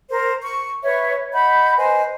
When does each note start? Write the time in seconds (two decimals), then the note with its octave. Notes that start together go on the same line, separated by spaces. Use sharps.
0.10 A#4 C5
0.43 C#6
0.84 B4 C#5 E5
1.33 D#5 F#5 B5 G6
1.77 B4 C5 D#5 G#5